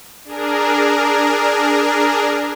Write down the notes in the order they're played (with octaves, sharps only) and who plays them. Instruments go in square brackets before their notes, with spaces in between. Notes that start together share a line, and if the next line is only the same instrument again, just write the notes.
[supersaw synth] D4 G#4 A#4